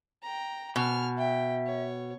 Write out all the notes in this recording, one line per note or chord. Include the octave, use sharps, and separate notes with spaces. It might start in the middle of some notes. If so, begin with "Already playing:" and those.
G5 A#5
B2 G#5 F6
E5 G5
C#5